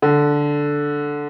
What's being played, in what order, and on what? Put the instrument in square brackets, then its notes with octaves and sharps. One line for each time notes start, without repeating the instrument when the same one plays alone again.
[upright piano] D3